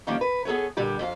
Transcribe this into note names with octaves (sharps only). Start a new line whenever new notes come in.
D3 D#3 F3 G3 A#3 C#4
B4
B3 G#4 A4 B4 C#5
A#2 D3 G3 G4
F2 G4 F5